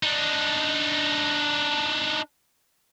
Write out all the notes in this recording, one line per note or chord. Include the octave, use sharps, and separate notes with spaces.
D4 D#4